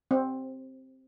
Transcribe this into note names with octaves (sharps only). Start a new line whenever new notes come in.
C4